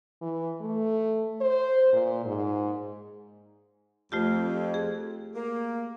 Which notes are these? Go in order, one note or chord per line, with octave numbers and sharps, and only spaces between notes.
E3
A3
C5
A#2
G#2
F2 A3 F4 G4
G#4
A#3